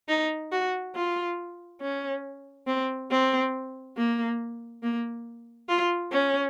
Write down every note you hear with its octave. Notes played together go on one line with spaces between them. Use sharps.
D#4
F#4
F4
C#4
C4
C4
A#3
A#3
F4
C#4